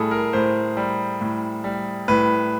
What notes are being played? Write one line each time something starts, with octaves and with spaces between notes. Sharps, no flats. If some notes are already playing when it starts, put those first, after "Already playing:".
Already playing: A2 G3 G#4 A4
A#4
A2 C5
G3
A2
G3
A2 B4